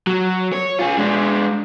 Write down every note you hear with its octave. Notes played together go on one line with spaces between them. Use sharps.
F#3
C#5
F4 G#4
G#3 D4